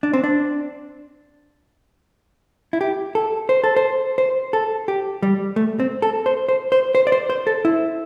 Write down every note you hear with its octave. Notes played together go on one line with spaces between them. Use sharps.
D4
C4
D4
E4
G4
A4
C5
A4
C5
C5
A4
G4
G3
A3
C4
A4
C5
C5
C5
C5
D5
C5
C5
A4
E4